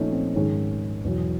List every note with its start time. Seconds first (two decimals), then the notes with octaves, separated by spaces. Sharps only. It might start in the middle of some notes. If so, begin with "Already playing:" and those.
Already playing: A#2 F3 A3 C#4 D#4
0.13 C4
0.35 G#2 D#3 G#3 C#4
1.04 E2 B2 F#3